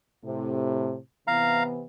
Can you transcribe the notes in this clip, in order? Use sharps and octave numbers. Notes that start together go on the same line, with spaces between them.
A2 C3
C3 E3 B3 F5 A#5